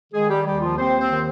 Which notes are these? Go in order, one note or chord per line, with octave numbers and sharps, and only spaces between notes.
D#3 G#3 G#4
G3 G4
D#2 G3 G4
F3 F4
D#2 C4 C5
C4 C5
D#3